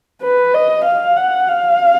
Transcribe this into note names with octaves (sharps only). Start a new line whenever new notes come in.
B4
D#5
F5
F#5
F5